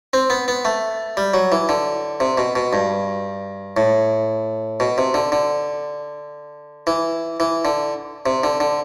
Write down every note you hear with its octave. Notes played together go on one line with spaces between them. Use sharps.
C4
B3
B3
A3
G3
F#3
E3
D3
C3
B2
B2
G2
A2
B2
C3
D3
D3
E3
E3
D3
C3
D3
D3